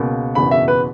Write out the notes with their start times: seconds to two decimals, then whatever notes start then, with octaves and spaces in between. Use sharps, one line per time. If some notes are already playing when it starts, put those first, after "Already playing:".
Already playing: C#2 B2 A#3
0.35 F#1 E2 B2 B5
0.51 E5
0.68 B4